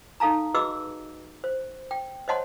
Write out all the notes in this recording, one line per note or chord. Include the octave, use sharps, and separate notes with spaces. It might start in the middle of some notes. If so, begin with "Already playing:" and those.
D#4 A4 F5 A5 A#5
F#4 G#4 B4 D#5 D6 E6
C5
G5
C5 C#5 D#5 F#5 A5 C6